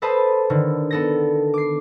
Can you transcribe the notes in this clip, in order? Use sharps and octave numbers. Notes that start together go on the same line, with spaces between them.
A4 B4 C5 D#5 A5 B5
D3 D#3
B3 A4 A#6
D6 C7